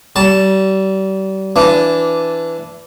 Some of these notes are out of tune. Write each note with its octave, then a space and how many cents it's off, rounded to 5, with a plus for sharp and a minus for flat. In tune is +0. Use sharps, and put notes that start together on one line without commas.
G3 -35 A5 +0
E3 +10 D4 -10